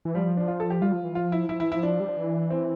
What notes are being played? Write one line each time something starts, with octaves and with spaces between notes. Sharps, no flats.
E3
F3 G3
D4
F4
A4
G4
G3 F4
F3
E3
F3 F4
E4
F3 E4
E3 E4
F3 E4
D4
G3
F3
E3
C4